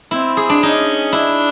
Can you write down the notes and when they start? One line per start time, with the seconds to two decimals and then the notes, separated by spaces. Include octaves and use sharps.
0.11 C4 E4
0.37 G#4
0.49 D4
0.63 C#4 D#4
1.12 D4 E4